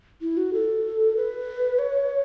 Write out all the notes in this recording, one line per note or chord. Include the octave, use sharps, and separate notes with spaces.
E4
F#4
A4
B4
C#5